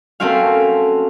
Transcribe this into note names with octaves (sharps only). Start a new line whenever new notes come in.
A3 A#3 C4 C#4 F#4 F5